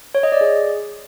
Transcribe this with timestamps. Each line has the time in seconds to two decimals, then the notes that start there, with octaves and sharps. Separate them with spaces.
0.15 C#5
0.23 D#5
0.32 D5
0.41 G#4